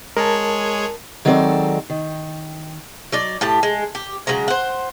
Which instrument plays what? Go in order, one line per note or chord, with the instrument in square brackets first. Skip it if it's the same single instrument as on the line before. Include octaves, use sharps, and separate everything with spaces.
[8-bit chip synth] G#3 G#4 C#5 [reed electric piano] A#4 A5
[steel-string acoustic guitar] D#3 F#3 G#3 C4 A4 D5
D#3
[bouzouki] F#3 D#4 D5
A2 G4 A5
G#3
G4
C#3 F#3 G#3 A#5
C5 F#5